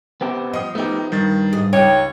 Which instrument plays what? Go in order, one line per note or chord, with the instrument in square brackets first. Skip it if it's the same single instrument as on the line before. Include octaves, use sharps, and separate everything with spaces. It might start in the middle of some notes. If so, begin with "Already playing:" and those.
[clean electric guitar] B3 C4 G4
[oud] F3 [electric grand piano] D#5 D#6
[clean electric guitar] A3 G4 [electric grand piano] B3 D#4
[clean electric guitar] G2 [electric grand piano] D#3 A6
[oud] G#2 G#4
[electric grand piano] C#2 D#4 [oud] G4 [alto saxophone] C#5